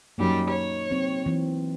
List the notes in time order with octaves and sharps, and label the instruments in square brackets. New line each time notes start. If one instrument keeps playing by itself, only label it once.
[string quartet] F#2 G3 [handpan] A#3 D#4
[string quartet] C#5
[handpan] F#3 C4
E3 C4